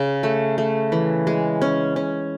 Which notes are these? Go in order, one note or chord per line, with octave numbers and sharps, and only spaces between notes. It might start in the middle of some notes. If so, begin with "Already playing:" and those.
Already playing: C#3
A3
A3
E3
G#3
C#4
C#4